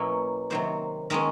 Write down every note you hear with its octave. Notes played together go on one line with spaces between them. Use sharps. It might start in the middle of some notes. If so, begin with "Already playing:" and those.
Already playing: B2 F#3 A#3 C#4 E4
C3 D#3 F#3 A#3 C5
D#3 G#3 C#4 A#4